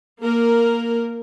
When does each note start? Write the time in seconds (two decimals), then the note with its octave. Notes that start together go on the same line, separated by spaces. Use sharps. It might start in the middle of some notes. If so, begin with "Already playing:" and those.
0.21 A#3 A#4